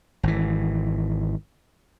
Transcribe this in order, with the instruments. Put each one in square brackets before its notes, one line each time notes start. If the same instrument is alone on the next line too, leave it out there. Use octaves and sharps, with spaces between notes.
[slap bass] G#1 E3